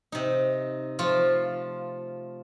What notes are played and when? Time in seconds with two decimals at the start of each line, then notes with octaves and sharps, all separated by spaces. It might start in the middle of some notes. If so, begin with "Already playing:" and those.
0.12 C3 D#4
0.99 F3 A3 F4